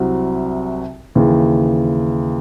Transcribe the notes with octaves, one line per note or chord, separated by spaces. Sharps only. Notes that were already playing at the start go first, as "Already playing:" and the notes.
Already playing: C2 C3 F#3 C4 F#4
D#2 C#3 E3